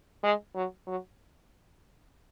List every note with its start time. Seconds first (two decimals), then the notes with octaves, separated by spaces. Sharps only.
0.23 G#3
0.55 F#3
0.87 F#3